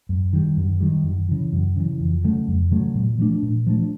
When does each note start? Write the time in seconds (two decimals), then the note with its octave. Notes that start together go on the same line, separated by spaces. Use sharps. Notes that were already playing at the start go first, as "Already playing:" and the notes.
0.09 F#2
0.33 D#3 G3
0.57 F#2
0.80 D#3 G3
1.04 F#2
1.28 C#3 E3
1.53 F#2
1.76 C#3 E3
2.00 F2
2.24 C#3 F#3 A3
2.48 F2
2.71 C#3 F#3 A3
2.95 A#2
3.19 F3 A3 D4
3.43 A#2
3.67 F3 A3 D4